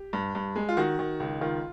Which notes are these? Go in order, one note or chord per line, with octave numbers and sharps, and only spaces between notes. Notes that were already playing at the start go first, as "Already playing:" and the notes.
Already playing: G4
G2
G2
G#3
F4
D#3 F#4
D#3
C#2
D#3 F4